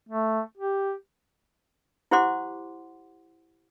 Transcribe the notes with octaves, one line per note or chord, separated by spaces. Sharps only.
A3
G4
E4 G4 C5 F#5 C6 D6